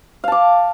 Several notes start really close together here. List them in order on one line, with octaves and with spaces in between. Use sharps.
F5 A5 D6